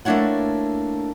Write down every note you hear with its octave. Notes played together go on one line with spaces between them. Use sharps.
A3 A#3 D4 E4 C#5 F#5